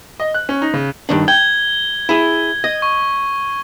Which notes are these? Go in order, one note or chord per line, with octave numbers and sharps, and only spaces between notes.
D#5
F#6
C#4
D#4
C#3
G2 D#3 D4
G5 G#6 G7
E4 G#4
D#5
C#6